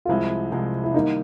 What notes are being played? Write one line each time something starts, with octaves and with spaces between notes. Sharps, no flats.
F4
C2 C3 F3 G#3 E4
C2 C3 F3 G#3
E4
D#3 G3 A#3 D#4